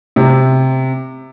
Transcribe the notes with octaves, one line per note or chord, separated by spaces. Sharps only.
C3